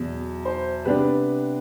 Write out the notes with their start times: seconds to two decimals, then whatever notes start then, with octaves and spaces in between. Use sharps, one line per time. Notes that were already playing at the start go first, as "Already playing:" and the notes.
Already playing: E2 B2 F#3
0.45 C5
0.85 C3 G3 B3 D4 B4